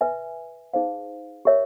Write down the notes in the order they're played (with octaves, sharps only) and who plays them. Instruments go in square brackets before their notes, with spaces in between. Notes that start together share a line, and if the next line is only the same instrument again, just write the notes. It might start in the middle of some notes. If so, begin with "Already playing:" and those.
[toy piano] B4 E5 G#5
D#4 G#4 C5 F5
G4 A#4 C#5 E5